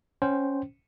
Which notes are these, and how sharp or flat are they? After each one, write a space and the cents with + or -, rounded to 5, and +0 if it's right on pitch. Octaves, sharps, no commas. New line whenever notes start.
C#4 +0 C5 +0 G5 -25